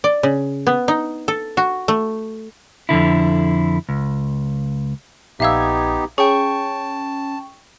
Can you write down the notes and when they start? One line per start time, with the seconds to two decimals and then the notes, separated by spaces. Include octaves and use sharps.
0.04 D5
0.23 C#3
0.67 B3
0.88 D#4
1.28 A4
1.57 F#4
1.88 A3
2.89 F2 G#2 D3 E4
3.89 C#2
5.40 A#1 B3 D#4 G4 E5 F5 E6 G#6
6.18 C#4 G#4 G5 A5 C#6